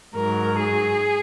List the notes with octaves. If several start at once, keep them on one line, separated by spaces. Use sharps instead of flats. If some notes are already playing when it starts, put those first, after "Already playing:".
G#2 F#3 A#4
G#4